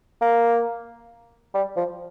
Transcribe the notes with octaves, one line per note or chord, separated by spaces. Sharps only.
A#3
G3
F3